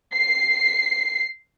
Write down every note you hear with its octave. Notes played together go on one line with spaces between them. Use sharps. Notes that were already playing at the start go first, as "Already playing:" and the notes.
C7